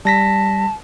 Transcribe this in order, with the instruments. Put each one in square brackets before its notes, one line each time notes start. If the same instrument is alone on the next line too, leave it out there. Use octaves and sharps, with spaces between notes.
[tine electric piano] G3 A#6 B6 [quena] A5